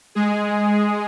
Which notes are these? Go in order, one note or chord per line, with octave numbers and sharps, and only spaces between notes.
G#3 G#4